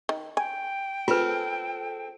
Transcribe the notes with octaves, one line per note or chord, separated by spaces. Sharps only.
D#3
G5 G#5
C4 F4 G#4 A4 B4